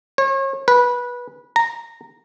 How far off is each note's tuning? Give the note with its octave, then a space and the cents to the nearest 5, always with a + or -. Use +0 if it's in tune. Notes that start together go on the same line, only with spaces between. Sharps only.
C#5 -35
B4 -20
A#5 -10